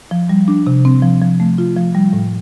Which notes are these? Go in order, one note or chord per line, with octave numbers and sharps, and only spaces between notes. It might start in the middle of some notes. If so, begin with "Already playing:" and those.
F3
G3
D4
C3
C4
F3
F3
A3
F4
F3
G3
A2